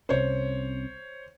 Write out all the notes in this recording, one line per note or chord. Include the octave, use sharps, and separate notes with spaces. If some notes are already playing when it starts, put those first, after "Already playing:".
C2 C3 C#4 C5 C#5